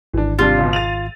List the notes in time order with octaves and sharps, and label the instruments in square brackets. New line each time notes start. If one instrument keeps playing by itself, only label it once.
[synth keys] G#1 [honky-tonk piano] E3 D4
[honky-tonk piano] C3 G3 D4 [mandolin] F4
[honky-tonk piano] C#2 B2
A6 D#7 F7